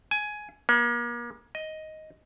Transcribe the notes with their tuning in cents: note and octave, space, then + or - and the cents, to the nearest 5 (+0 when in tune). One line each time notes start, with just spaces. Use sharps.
G#5 +15
A#3 +40
D#5 +5